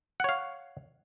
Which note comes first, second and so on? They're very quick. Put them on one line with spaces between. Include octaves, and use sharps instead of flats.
F#5 C#5 F5